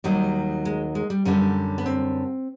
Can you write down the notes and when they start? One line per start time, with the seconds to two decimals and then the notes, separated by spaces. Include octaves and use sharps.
0.04 D#2 D#3 F#3 G3
0.65 G#3
0.95 G#3
1.10 G3
1.25 F#2 D3 G3 C#4
1.78 B3
1.86 C4